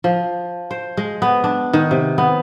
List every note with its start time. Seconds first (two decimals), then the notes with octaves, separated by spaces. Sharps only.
0.04 F3
0.71 C5
0.97 G#3
1.22 B3
1.44 D4
1.73 D#3
1.91 C3
2.18 B3